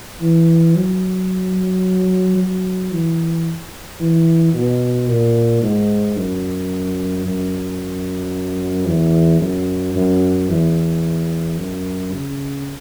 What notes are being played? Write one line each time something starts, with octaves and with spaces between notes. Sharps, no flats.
E3
F#3
F#3
E3
E3
B2
A#2
G#2
F#2
F#2
E2
F#2
F#2
E2
F#2
C#3